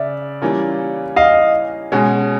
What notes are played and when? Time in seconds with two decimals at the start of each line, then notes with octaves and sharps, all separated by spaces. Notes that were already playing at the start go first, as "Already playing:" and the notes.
Already playing: C#3 D5 E5
0.42 E3 G3 A#3 C#4 F4
1.16 D#5 F5
1.92 B2 G#3 C#4 F#4